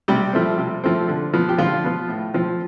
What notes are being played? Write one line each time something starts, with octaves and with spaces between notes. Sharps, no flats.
C3 G3 G4
F3 A3 C4
C3
F3 A3 C4
D3
F3 B3
G4
D3 F3 F4
F3 B3
A2
F3 C4